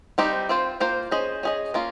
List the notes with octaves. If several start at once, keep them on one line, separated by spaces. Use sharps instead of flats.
G3 C4 D#4 G4
C4 F4 C5
A#3 F4 C5
C#4 G#4 C5 D#5
C#4 G#4 D#5
A#3 C#4 F4